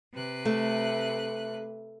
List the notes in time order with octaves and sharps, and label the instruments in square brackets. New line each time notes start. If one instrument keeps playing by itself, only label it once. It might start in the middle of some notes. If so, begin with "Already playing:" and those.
[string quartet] C3 B4 F#6
[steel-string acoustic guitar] A3